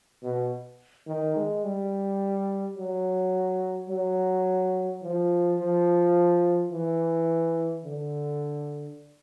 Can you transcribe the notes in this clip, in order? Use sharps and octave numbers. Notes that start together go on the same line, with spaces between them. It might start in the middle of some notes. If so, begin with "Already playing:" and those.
B2
D#3
G#3
G3
F#3
F#3
F3
F3
E3
D3